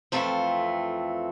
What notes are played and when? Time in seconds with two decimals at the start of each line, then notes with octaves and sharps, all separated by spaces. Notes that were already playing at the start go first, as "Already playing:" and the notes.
0.12 F2 E3 A3 C4 F4